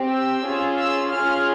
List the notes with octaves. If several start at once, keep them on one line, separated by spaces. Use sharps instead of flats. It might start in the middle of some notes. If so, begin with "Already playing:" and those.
Already playing: C4 G4
E6
C#4 F4 G#4
E6
C#4 F4 G#4 F6